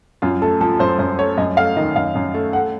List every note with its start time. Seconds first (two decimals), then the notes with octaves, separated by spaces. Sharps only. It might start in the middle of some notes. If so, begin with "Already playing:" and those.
0.22 F#2 F4
0.42 A3 A4
0.61 F3 A4
0.79 F#2 C5
0.99 F#2 C5
1.19 A3 C#5
1.38 F#2 D#5
1.57 A3 F5
1.77 D#3 D#5
1.95 F#2 F5
2.15 F#2
2.34 A3
2.53 A3 F#5